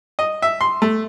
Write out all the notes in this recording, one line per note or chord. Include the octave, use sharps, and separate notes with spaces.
D#5
E5
C6
A3